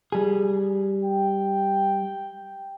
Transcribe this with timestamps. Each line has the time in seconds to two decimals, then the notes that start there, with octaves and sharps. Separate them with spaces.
0.12 G3 G#4
1.04 G5